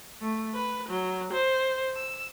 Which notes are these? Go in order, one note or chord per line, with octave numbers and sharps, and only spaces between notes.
A3
B4
F#3
C5
E6